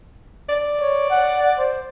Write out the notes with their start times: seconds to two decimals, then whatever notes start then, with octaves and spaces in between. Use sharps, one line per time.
0.49 D5
0.80 C#5
1.10 F#5
1.58 C5